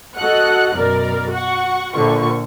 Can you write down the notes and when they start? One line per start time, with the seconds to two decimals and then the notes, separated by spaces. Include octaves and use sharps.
0.17 F#4 A4 D#5 F#5 F#6
0.75 F#2 B2 A#4 D5
1.31 F#4 F#5 C#6
1.94 A#1 A#2 D3 F4 C#6